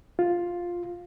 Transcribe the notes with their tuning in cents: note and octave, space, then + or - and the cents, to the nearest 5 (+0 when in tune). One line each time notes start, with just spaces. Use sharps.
F4 +5